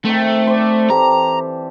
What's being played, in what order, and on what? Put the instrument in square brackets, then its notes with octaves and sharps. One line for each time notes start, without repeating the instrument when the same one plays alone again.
[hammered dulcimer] D#3 C4 [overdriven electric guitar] A3
[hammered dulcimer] C5 D5
[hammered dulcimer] E3 G4 A4 [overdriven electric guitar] A#5